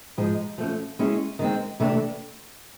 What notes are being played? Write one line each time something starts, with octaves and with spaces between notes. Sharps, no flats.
G#2 F3 G#3
F3 A3 C#4
G#3 C#4 E4 G#4
D#3 G#3 C4
C3 E3 A3 D4